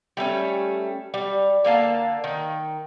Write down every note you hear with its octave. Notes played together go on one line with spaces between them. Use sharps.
G3 A3 C4 C#4
G3
D3 A#3 F5 A5
D#3